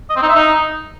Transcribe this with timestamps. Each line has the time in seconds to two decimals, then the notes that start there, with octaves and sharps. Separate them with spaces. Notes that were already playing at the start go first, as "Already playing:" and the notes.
0.10 D#5
0.16 C4
0.22 D#4
0.29 E5
0.35 D#4